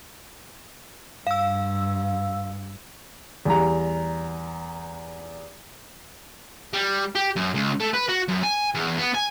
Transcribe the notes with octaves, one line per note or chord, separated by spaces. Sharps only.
G2 F5 E6
E2 G3 A#5
G3
G4
F#2
C#2
A3
B4
F#4
F#2
G#5
E2
B3
G#5